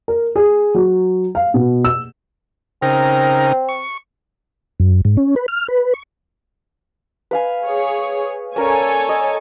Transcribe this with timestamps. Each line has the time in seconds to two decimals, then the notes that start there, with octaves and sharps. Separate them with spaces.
0.08 A#4
0.36 G#4
0.75 F#3
1.35 F5
1.54 B2
1.84 E6
2.82 C#3 C4 D#4 A#4
3.69 C#6
4.80 F#2
5.05 G#2
5.17 C#4
5.36 B4
5.48 F6
5.68 B4
5.94 C#6
7.31 B4 F5 G#5
7.64 G#4 C#5
8.56 C#4 A4 A#4 C#5 D5 G#5
9.09 D#5